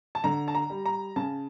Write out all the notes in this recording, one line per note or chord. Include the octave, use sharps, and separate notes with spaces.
A5
D3 A#5
A5
A#5
G3
A#5
C#3 A5